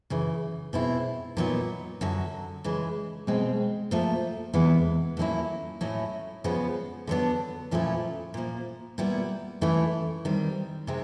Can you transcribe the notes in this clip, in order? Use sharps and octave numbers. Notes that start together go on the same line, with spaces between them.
F#2 C#3 E3
B2 G#3 C4 E4
A#2 F#3 B3 D#4
F#2 D3 F#3
C#3 E3 G#3
B2 G#3 C4
A#2 F3 A3
E2 C3 E3 G#3 B3
A2 F#3 A#3 C#4 E4
A2 F#3 A3 C#4 E4
C#3 F3 G#3 B3
D3 F#3 B3 D4
A#2 F3 A3 C#4 E4
A#2 F3 A#3
A#2 G3 B3 E4
A2 E3 A3 C#4 E4
D#3 G3 C4
C3 D#3 G#3 C4